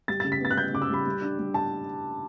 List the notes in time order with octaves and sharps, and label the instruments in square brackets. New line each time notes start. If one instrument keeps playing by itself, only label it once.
[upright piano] G3 A6
A6
C#3
B6
B3 A6
F#6
G3 G6
C#3 D6
E6
G3 B5
G3
D4
G3
A5